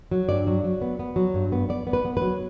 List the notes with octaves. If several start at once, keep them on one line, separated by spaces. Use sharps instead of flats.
F#3
G2 D5
F#3
F#3
B3
B3
F#3
G2
B3
B3 D5
B3
B4
B3
F#3 B4